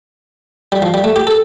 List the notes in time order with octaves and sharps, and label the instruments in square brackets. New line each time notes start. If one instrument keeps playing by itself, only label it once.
[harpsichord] G3
F3
G3
A3
G4
A4